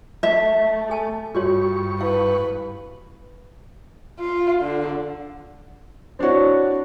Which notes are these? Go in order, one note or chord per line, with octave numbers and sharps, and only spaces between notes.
A3 E5
A4 G#5 A5
G2 F4 F#4 C#5 C#6
E4 B4 F5
F4
D3
C4 D4 E4 F#4 C#5